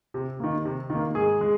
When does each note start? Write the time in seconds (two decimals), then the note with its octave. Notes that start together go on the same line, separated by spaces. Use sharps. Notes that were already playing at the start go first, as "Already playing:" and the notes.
0.14 C3
0.40 D#3 A#3
0.65 C3
0.90 D#3
0.95 A#3
1.15 G#2 G#4
1.41 G#3